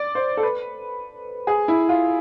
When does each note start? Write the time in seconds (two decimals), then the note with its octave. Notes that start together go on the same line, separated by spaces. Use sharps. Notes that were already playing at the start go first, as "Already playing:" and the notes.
Already playing: D5
0.15 C5
0.37 A4
0.43 B4
1.47 G#4
1.68 E4
1.89 F4